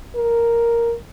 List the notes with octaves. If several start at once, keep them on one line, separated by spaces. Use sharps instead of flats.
A#4